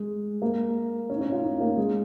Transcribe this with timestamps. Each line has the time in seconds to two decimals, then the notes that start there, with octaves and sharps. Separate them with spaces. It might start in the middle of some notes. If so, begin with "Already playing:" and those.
Already playing: G#3
0.42 A#3
1.10 C#4
1.16 D#4
1.21 C#4
1.32 F4
1.44 D#4
1.61 A#3
1.77 G#3